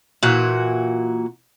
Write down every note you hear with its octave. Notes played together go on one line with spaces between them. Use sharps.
A#2 E3 F#4